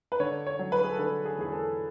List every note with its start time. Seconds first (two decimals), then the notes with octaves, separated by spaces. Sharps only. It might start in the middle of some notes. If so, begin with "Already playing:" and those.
0.12 B4
0.20 D3 C#5
0.47 C#5
0.59 F#3
0.72 B4
0.83 G#4
0.91 A4
0.99 D3 B4
1.25 G#4
1.38 E2 G#4
1.52 A4